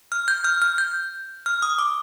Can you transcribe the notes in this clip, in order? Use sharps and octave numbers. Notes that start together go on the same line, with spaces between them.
F6
G6
F6
F6
G6
F6
D#6
D6